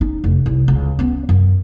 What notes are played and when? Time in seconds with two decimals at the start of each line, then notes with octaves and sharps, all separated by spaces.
0.01 C#4 D#4
0.24 F1
0.46 C2
0.68 C#2
0.99 B3 C#4
1.29 F#2